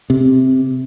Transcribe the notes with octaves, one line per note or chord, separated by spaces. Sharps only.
C3